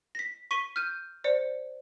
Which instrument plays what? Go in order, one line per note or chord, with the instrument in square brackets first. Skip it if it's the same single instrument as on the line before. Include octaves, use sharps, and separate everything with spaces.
[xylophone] A#6 B6
C#6 B6 D#7 G7
F6 G6 D#7
C5 D5 C#7